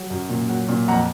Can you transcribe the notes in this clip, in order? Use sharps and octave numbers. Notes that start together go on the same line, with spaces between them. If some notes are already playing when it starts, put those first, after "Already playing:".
Already playing: F#3
F#2
A#2
F#3
A#2
F2 F#5 A#5